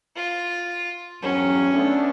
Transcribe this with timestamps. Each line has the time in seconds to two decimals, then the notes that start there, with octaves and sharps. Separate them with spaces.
0.16 F4
1.22 E2 G2 F#3 C#4
1.73 A3 B3 D4